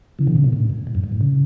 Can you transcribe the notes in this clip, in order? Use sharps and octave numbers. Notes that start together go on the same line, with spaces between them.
C#3 E3
B2 D3
C#3
B2
A2
G#2
G#2
F#2
G#2
A2
C#3